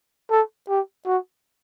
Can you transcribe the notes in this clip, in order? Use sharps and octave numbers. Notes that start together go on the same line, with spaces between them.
A4
G4
F#4